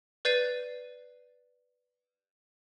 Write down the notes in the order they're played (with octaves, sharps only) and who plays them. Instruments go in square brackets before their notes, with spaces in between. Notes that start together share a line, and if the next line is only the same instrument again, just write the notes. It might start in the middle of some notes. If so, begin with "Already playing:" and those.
[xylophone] B4 D5 G6 A6 C7 D#7